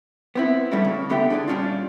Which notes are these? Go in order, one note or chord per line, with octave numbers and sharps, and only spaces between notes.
B3 C4 E4
G3 A3 C#4 D4 E4 F#4
C#3
D2 D3 B3 G4 E5 G5
D4 D#4 G#4 D5
A#2 G3 C#4 D4 F4